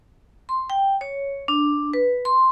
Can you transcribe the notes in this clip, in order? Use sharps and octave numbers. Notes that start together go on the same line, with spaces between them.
C6
G5
C#5
D4
B4
C6